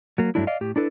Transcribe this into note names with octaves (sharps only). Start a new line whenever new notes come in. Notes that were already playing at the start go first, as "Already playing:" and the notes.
F#3 A#3
G2 F#3 A3 D4 E4
D5 D#5 F5
A2 G4
D4 E4 A4 B4